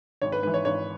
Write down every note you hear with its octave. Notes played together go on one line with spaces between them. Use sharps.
G#1 C#5
B4
G#2 E3 B4
C#5
G#1 C#5